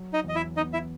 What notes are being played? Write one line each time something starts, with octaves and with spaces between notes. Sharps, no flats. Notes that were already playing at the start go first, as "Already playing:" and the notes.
Already playing: F#3
D#4 D#5
E2 D#5
E4 E5
B3 D#4 D#5
E4 E5